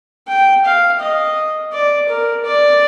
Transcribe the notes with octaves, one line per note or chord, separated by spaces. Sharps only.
G5
F5
D#5
D5
A#4
D5